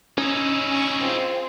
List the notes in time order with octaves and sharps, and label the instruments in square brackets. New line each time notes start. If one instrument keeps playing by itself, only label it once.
[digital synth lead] C#4 [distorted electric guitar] D#4 E4
[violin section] G#5 C#6
C4 F4 G#4